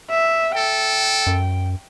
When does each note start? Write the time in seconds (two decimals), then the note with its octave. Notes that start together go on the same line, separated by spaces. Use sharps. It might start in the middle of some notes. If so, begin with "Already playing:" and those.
0.11 E5
0.56 A4 G5
1.27 F#2